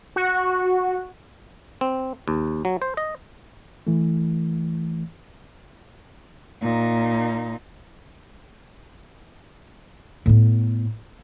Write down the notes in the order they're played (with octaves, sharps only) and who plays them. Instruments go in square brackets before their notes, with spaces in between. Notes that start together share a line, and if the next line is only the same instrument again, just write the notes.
[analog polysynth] F#4
[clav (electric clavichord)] C4
D#2
F#3
C5
D#5
[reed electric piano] E3 A3
[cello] A#2 D#4
[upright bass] A2 B3